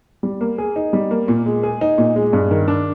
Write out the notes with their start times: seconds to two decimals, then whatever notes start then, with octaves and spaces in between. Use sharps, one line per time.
0.23 G3
0.41 A#3
0.58 G#4
0.76 D#4
0.93 G3
1.11 A#3
1.28 A#2
1.46 G#3
1.63 G#4
1.81 D#4
1.98 A#2
2.16 G#3
2.33 G2
2.51 D#3
2.68 D4